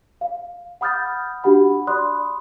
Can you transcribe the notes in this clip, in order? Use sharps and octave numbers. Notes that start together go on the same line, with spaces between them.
F5
F#5 B5 D#6 F6 G6 A6
D4 F#4 G4 F#5 B5
D5 B5 C6 D#6 F#6